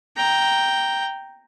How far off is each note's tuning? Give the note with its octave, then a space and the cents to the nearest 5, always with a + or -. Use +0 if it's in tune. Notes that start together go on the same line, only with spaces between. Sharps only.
G5 +0 A#5 +0